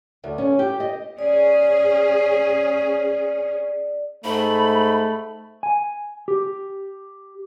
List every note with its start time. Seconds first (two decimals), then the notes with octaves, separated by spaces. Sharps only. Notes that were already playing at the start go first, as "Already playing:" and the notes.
0.24 D2
0.38 C#4
0.59 G4
0.80 D#5
1.19 C#4 G#4 D5
4.24 G#2 A3 B5
5.63 G#5
6.28 G4